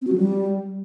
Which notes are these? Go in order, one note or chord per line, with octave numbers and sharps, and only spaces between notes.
C4
F#4
F#3
G3